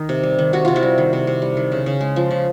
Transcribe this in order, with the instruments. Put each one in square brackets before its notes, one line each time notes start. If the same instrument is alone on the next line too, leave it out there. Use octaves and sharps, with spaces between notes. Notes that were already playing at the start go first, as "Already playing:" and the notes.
Already playing: [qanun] D#3 D#4
C3
G3
D#3
C3 F#4
C3 F4
E4 F#4
G3
D#3
C3
C3
G3
D#3
C#3
C#3
G#3
F3
C#3